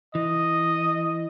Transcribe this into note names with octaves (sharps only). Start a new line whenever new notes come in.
E3 D#5